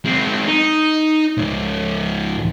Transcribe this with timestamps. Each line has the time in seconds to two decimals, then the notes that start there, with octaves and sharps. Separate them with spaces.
0.05 G#3 C4
0.48 D#4
1.37 C#2 G#2